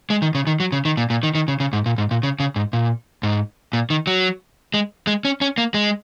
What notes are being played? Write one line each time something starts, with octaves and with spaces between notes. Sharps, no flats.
G#3
D#3
C#3
D#3
F#3
C#3
D#3
A#2
A#2
D#3
D#3
C#3
C#3
G#2
A#2
G#2
A#2
C#3
C#3
G#2
A#2
G#2
A#2
D#3
F#3
G#3
G#3
C#4
C#4
A#3
G#3